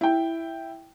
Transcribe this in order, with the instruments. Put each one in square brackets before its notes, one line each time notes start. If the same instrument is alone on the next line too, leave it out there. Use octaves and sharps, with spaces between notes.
[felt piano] E4 G5